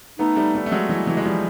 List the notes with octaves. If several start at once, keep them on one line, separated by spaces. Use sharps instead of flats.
A3 B3 D#4
G3 A3
G3 A3
A3
F#3 G#3
E3 F#3
E3 F#3
G#3
F3 G3